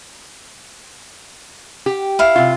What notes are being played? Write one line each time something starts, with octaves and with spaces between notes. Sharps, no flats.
G4
E4 F5
C3 F4